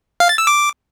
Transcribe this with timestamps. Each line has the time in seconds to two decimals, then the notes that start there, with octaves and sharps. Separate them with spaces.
0.20 F5
0.29 A6
0.38 E6
0.47 D6